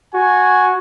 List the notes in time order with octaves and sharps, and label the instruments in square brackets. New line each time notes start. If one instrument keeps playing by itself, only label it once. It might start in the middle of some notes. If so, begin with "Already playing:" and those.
[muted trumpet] F#4 [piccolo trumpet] G#5